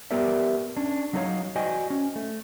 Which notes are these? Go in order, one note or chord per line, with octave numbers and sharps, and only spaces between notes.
B3 G4 A#4 D5 E5
C#4 D4
F#3 D#4 E4 A4 C#5 F5
F#4 C5 D5 D#5 G5 G#5
C#4
A3